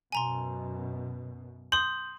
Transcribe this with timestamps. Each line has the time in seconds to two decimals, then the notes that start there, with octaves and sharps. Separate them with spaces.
0.12 F#2 B2 G#5 A#5 C6
1.72 C6 D#6 G6 F#7